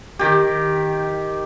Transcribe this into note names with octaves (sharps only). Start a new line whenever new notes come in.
D#3 G4